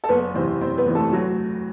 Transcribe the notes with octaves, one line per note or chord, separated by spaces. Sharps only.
A4
F#1 B3 B4
E2 C3 E3 C4 C5
F#1 C4 C5
B3 B4
E2 C3 E3
A3 A4
D2 F#3 F#4